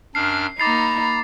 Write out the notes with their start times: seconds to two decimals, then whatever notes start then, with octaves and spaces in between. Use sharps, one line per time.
0.15 F#2 D4 F6 C7
0.60 A#3 D#4 A#5 B5 D6 A6 C7